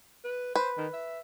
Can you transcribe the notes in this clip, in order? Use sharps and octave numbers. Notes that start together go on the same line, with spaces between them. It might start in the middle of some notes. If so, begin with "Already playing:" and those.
B4
B4 C5
D#3
E5